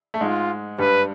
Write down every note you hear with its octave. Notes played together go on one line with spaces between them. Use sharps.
A3
G#2 G#3 F4
G2 G3 B4